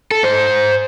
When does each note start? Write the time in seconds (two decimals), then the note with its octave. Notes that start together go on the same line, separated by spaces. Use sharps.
0.11 A4
0.23 G#2 C5
0.49 G#2